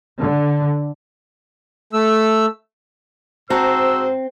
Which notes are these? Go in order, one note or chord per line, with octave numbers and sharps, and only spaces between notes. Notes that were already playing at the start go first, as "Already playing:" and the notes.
D3
A3 E6
G#2 C4 F#4 C5 A5 A#5 E6